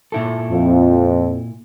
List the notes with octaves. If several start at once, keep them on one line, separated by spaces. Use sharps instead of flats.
A#2 E4 A4
F2